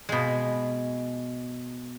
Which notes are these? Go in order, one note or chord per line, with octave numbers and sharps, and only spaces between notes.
B2 G#3